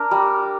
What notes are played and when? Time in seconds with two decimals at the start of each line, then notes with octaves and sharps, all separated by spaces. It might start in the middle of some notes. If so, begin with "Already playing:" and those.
Already playing: D4 A#4
0.11 G3